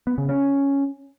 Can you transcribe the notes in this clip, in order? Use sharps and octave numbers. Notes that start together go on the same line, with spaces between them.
B3
C#3
C#4